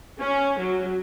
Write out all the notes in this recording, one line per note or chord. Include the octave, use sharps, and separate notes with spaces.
C#4
F#3